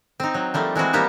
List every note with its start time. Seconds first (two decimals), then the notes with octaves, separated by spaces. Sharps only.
0.20 C4 D#4
0.34 F#3
0.54 F3 G3 A3 A#3
0.75 E3 G#3 C4 F#4
0.93 G3 A#3 B3 G4 C5